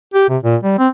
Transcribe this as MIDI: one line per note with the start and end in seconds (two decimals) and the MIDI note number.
0.14 0.26 67
0.29 0.38 48
0.43 0.56 46
0.63 0.76 55
0.79 0.88 60